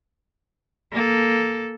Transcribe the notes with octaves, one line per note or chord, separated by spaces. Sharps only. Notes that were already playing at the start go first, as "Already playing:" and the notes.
A#3 A4